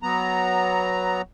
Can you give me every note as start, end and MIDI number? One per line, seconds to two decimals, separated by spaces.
0.03 1.22 54
0.03 1.22 59
0.03 1.22 82